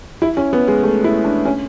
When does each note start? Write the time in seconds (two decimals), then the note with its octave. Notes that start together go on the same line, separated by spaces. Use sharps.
0.22 E4
0.37 C#4
0.53 B3
0.68 G#3
0.83 A3
1.04 E4
1.24 D4
1.45 C#4